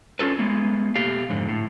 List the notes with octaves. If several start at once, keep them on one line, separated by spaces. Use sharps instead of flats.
C#4 F4 A4 B4
G#3 A#3 B3
B2 A3 G4 F5
F2 G#2 D3
A2